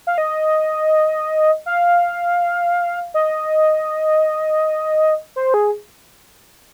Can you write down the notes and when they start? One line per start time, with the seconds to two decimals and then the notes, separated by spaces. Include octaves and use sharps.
0.07 F5
0.18 D#5
1.66 F5
3.14 D#5
5.36 C5
5.54 G#4